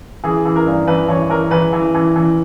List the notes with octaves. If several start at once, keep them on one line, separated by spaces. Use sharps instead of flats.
E3 G#4
E3
A#4
G2
E3 B4
E3 C#5
E3 A#4
E3 B4
E3
E3
E3